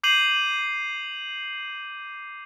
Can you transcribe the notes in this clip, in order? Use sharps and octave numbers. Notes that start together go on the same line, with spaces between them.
D6 G6 C7 D#7 F7 F#7